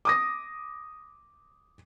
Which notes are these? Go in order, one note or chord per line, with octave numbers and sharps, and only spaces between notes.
D6 D#6 A#6